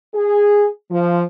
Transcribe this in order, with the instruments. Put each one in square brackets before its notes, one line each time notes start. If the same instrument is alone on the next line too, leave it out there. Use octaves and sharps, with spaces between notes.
[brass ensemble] G#4
F3